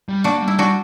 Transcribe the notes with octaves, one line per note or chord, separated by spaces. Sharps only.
G3
A#3 D4 F#4
G3
E4
G3 D4 F#4